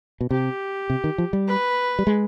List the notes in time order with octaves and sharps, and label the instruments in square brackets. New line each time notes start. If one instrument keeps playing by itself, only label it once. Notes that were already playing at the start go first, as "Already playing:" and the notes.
[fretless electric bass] B2
[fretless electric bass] C3 [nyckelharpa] G4
[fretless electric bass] C3
D#3
F3
G3
[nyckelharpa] B4
[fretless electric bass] G3
G#3